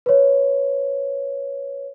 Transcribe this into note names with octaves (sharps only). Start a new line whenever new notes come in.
B4 C#5